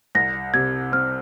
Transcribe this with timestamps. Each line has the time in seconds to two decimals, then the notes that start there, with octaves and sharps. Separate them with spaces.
0.15 C2 A#6
0.54 C3 G#6
0.92 C4 F6